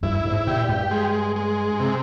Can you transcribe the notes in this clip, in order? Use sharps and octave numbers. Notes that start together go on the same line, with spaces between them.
G2 E4
G#2
A#2 G4
G2
G#3
G#3
C3